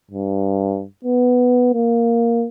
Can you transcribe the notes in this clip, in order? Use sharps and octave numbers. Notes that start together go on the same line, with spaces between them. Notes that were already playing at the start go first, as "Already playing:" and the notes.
G2
B3
A#3